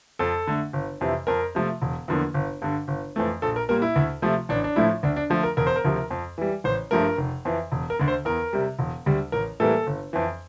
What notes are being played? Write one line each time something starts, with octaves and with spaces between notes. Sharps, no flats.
F2 A4
D3 A3
G1
F2 C3 E3
F2 A#4
C3 F3 A3
E1
E2 D3 F3 A#3
G1
G2 D3
G1
F2 E3 A3
A#1 A4
A#4
A#2 G3 A#3 A#4
E4
D2
C3 F3 A3
A1 D4
D4
A2 F3 A3 E4
D2 D4
D4
D3 F3 A3
A#4
E1 A#4
C5
A#4
D2 C3 F3
F2
E3 G3
A1 C5
G2 F3 A3 A#4
F1
F2 E3
E1
A#4
D2 D3
C5
E2 A#4
C3 G3
E1
D2 D3 G3
A1 A#4
A2 E3 G3 A#3 A4
G1
F2 E3